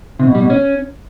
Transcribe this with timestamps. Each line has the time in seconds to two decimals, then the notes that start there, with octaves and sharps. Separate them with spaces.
0.19 C3
0.27 B2
0.35 G3
0.42 B2
0.50 C#4